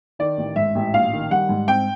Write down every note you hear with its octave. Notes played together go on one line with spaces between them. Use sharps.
D#3 D5
A1
G#2 E5
A1
A#1 F5
D#3
G3 F#5
G#2
C4 G5